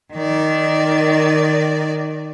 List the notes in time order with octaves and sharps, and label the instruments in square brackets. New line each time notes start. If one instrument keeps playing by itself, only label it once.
[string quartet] D#3 D5